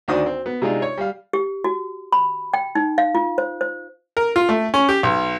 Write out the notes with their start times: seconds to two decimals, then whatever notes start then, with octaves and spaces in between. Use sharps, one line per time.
0.08 D2 D#3 D4 F#4 C5 D#6
0.26 C4
0.46 B3
0.62 C3 G#3 D4 D#4 F4
0.82 C#5
0.98 G3 F5
1.33 G4
1.64 F#4
2.12 B5
2.54 G5
2.75 D#4
2.98 F5
3.15 F4
3.38 C5
3.61 C5
4.17 A#4
4.36 F4
4.49 A3
4.74 C#4
4.89 G4
5.03 B1